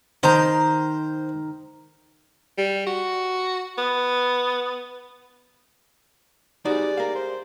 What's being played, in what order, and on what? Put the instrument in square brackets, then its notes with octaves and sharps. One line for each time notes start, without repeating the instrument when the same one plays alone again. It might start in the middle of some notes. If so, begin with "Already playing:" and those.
[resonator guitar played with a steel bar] D#3 A#5 [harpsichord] C5
[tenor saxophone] G3
F#4
B3
[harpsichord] C3 G3 G#3 [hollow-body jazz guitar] D#4 F#4 [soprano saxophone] D5
[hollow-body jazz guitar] A#4 F5
[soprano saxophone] C5